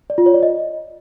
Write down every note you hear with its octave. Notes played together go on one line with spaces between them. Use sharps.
D5
F4
C#5
D5
D#5